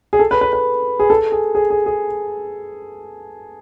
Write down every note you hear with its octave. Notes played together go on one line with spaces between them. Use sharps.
G#4
A4
B4
B4
B4
G#4
A4
G#4
G#4
G#4
G#4